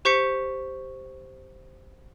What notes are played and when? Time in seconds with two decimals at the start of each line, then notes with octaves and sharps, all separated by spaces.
0.05 G4 C5 C#6 G6 B6 C#7